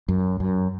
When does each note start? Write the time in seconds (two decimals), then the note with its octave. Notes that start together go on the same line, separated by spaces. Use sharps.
0.08 F#2
0.40 F#2